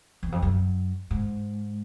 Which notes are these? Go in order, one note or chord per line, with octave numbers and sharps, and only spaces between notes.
E2
F2
F#2
G#2